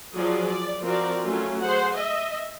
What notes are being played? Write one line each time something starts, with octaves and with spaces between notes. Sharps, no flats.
F3 F#3 G#4 D5
D5
F3 C4 F#4 A#4 D5
F#3 A3 C#4 F4
G#4 C5 F#5
D#5 E5